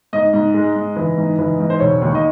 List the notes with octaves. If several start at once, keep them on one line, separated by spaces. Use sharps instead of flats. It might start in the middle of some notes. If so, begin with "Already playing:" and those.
G#2 D#5
G#2
G#3
G#2
E3
G#2
E3
G#2
C5
E1 C#5
D#2
D#5